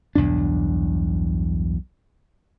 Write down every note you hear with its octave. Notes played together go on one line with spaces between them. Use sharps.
B1 E2 G2 D4